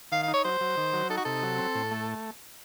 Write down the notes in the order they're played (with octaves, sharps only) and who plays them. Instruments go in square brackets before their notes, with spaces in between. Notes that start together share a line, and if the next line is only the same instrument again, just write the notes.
[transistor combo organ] D#3 [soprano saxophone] F5
[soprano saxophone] F5
[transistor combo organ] D#4
[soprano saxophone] C#5
[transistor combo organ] F#3 [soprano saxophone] C5
[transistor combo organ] F#3
D#3
F#3
[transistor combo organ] D#4 [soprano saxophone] A4
[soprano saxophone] F#4
[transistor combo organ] C3 [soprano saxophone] A4
[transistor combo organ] F#3
C4
A2
A3